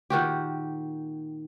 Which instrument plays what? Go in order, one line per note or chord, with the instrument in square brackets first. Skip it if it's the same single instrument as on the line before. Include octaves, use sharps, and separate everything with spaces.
[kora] A#2 D#3 F#4 G4